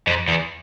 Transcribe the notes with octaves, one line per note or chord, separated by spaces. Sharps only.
F2
E2